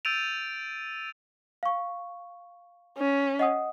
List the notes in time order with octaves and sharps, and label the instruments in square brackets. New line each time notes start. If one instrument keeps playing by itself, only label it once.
[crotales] E6 G6 A6 D7 D#7 F7
[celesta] F5 C#6
[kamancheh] C#4
[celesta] D#5 F#5 D#6